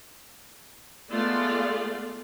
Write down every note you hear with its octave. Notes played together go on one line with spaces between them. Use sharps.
G#3 A3 B3 F4 D5